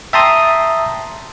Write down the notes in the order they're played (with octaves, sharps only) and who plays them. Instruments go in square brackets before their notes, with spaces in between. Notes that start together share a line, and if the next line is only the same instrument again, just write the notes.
[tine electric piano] E5 G5 A5 A#5 C6 D#6